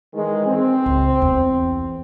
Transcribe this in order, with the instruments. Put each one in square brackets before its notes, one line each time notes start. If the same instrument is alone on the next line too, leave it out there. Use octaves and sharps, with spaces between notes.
[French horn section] D#3 E3 G#3
C4
[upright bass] C#2
E2